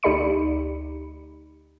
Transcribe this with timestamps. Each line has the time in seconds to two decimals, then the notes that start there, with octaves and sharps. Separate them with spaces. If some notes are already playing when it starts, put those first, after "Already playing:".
0.03 D2 D#4 G4 D5 B5 C#7